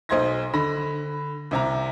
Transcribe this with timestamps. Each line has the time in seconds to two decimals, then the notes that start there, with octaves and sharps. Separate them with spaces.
0.09 B1 C5 D#5 C6 G#6 A#6
0.53 D3 B5 A#6
1.51 C2 C3 A#5